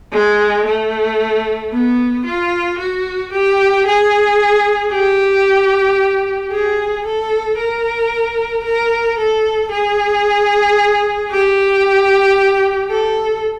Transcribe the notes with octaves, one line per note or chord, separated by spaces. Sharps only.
G#3
A3
B3
F4
F#4
G4
G#4
G4
G#4
A4
A#4
A#4
A4
G#4
G4
A4